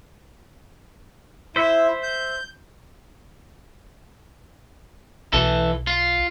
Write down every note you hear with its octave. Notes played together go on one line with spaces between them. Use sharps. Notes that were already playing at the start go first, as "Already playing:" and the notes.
E4 C5 E5
G6
B1 E3 A4
F4